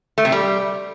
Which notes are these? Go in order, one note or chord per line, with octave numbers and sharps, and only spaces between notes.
A3
C3
G3